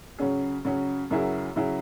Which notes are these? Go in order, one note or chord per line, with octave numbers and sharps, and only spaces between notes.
C#3 F#3 C#4 G#4
C#3 F#3 C#4 G#4
F#2 C#3 F#3 E4 G#4
C#3 F#3 E4 G#4